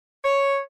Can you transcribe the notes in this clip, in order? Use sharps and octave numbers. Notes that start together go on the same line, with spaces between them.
C#5